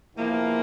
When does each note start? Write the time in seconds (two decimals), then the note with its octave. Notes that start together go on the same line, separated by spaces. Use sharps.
0.15 E2 C3 F3 A#3